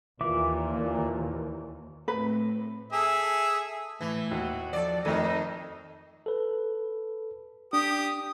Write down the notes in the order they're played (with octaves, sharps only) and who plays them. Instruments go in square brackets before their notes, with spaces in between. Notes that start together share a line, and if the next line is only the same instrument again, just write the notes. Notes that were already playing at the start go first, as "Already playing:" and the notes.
[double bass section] D#2 [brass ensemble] A#2 [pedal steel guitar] E3 E5 D6
[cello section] A2 A3 C4 [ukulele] B4
[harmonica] G#4 A4 E5
[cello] A2 [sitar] E3
[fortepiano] D#2 [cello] F#4
[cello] F3 A4 [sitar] D5
[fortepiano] F2 A3 A4 [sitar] D#3 [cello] D#4 D#5
[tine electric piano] A4 B4
[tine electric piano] D4 [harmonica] G4 D#6